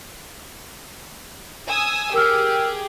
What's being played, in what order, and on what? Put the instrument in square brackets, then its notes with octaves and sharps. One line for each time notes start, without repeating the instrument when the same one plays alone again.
[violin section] G#5 D#6 E6
[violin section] G4 G#4 [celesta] A#4 E6 F6